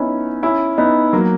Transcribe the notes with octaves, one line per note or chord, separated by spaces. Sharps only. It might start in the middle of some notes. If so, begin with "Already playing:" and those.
Already playing: B3 C#4 D#4 E4
C#4 E4
B3 D#4
F#3 A#3